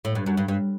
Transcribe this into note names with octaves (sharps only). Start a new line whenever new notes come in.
A2
G2
F#2
G2
G2